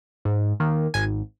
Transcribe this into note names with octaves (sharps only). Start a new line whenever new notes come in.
G#2
D#3 A#3
G#1 G#5